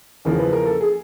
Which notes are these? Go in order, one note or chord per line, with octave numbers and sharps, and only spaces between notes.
E2 C#3 F3 A#3 A#4
B4
A#4
A4
G#4